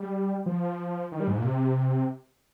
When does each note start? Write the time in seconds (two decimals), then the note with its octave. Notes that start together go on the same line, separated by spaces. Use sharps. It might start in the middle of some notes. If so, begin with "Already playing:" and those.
Already playing: G3
0.46 F3
1.12 D#3
1.20 G3
1.28 G#2
1.38 A#2
1.45 C3